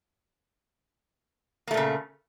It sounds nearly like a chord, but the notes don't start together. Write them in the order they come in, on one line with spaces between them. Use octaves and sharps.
A#3 A3 A#2 C#3